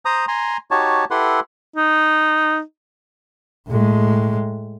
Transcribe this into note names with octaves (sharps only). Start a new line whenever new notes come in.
C5 A#5 D#6
G#5 A#5 C6
D#4 F#4 G4 C#5 A5
E4 G4 A4 B4 F#5 C6
D#4
A2 G#3